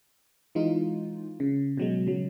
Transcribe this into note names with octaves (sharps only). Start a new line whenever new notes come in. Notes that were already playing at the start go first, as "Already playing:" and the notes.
E3 G#3 D#4 F4
C#3
B2 F#3 G#3
C#3 F#3